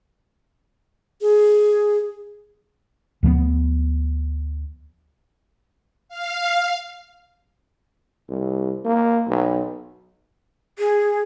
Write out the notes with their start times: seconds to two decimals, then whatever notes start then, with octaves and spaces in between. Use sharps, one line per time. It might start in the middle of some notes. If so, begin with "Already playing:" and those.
1.22 G#4
3.23 D2 F3 G3 B3
6.09 F5
8.29 C2
8.85 A#3
9.28 B1
10.79 G#4